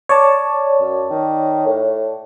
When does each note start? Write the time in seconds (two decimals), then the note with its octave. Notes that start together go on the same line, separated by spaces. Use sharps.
0.09 C#5 D5 A5
0.81 F#2
1.10 D#3
1.66 A2